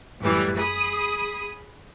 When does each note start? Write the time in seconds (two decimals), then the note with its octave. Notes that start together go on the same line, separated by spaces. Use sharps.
0.19 F#2 A2 E3 G3
0.58 G#4 B5 D#6